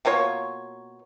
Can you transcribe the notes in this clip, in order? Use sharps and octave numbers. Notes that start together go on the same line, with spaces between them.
B2 A#3 F4 C#5